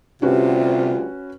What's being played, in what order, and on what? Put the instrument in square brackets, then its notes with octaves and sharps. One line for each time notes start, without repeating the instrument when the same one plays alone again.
[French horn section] D2 G3 F4 [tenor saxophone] C3 [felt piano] C#4 F#4 B4